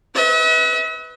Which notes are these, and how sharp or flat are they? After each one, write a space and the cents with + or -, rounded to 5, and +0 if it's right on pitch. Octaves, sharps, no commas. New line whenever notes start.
B4 +0 E5 -45